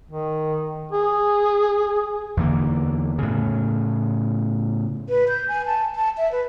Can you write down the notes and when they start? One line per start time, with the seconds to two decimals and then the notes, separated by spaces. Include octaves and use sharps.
0.11 D#3
0.92 G#4
2.37 E2 D3 A#3
3.18 A2 C#3
5.09 B4
5.28 G6
5.48 G#5
5.66 A5
5.95 A5
6.17 E5
6.32 B4